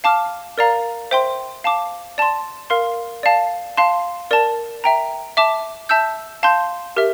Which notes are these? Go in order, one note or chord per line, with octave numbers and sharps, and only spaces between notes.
F5 A5 D6 F6
A#4 D5 F5 A#5
C5 E5 G5 C6
F5 A5 D6
D5 A5 C6
A#4 F5 C6
D5 F5 A5
F5 A5 C6
A#4 D5 A5
E5 G5 A#5
E5 A5 D6
E5 A5 E6 G6
F5 A5 C6 G6
G4 A#4 E5